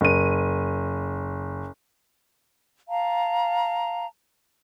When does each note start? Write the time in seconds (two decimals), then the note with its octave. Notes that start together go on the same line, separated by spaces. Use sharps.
0.01 F#1 D#7
2.88 F5 A5 A#5